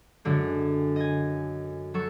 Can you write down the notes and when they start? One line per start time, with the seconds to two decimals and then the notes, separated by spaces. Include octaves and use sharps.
0.25 F#2 D3 G#3
0.96 D#5 G#5
1.94 F#3 A4 C#6